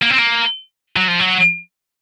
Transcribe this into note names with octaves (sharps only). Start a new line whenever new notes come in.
A#3
C4
A#3
F#3
F3
F#3